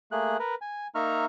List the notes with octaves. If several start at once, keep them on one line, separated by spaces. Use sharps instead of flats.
A3 A#3 G#4 F#6
A#4 B4
G#5
A#3 D#4 E5 A#5 C#6 F6